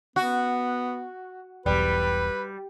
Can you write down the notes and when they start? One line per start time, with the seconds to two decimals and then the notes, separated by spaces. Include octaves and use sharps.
0.16 B3 F#4
1.66 E1 B1 E2 G3 B4